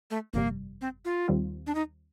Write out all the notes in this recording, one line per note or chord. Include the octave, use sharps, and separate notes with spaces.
A3
G1 F2 C3 G3 A#3
C4
F4
D#2 D#3 G3 C4 F4
D4
D#4